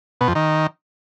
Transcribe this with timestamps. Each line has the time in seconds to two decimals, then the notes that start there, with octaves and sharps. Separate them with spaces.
0.21 B2
0.28 F2
0.35 D#3